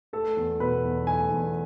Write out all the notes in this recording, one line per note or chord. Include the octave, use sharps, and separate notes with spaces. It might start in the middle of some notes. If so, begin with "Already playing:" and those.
A3 A4
E2
B2 B4
E2
A3 G#5
E2